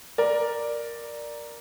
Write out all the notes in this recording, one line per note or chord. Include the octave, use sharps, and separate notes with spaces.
A#4 D5